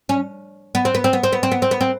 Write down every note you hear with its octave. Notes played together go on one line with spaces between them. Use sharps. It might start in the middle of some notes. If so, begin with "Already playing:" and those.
C#4
B3
C4
B3
C4
B3
C4
B3
C4
B3
C4
B3
C4